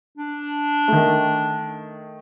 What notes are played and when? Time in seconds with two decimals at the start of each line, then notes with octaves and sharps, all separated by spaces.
0.17 D4
0.88 D#3 A3